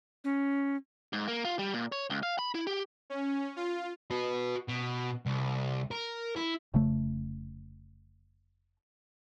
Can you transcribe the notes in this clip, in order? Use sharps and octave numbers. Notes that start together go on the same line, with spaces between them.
C#4
G#2
A#3
F4
G3
A#2
C#5
C#2
F5
B5
E4
G4
C#4
F4
F#4 B4
B2
C2
A#4
E4
F1 C#3 A3